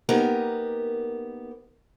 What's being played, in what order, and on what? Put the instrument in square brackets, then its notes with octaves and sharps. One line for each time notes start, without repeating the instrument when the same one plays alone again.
[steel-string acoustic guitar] A#3 B3 D#4 G4 A#4